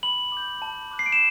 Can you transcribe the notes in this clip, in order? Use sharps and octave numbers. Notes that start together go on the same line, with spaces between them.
B5 F#7
D6 G6
A5
D6 F#6
C7
D7
E7